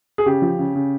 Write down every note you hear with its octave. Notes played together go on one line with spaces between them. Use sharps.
G#4
C#3 G4
F3
C#3
C#3